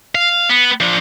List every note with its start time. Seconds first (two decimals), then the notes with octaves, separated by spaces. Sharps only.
0.15 F5
0.49 B3
0.80 F3 D4